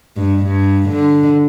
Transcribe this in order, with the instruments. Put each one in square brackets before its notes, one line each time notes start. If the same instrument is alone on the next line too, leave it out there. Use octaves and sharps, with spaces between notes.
[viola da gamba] G2
G2
D3